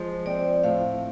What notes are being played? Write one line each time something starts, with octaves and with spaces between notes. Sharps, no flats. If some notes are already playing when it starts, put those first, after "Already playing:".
Already playing: F3 G#3
C4 D5
A2 F5